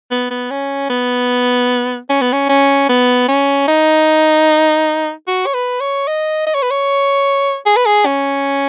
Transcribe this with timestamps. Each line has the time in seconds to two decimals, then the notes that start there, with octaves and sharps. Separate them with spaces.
0.11 B3
0.30 B3
0.51 C#4
0.90 B3
2.10 C#4
2.21 B3
2.32 C#4
2.49 C#4
2.89 B3
3.28 C#4
3.68 D#4
5.27 F#4
5.46 C#5
5.54 B4
5.80 C#5
6.07 D#5
6.46 D#5
6.54 C#5
6.63 B4
6.70 C#5
7.65 G#4
7.76 B4
7.86 G#4
8.06 C#4